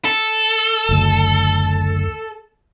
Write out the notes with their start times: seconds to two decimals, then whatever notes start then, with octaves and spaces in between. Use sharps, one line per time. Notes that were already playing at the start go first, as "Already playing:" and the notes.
0.05 A4
0.89 F#1 D2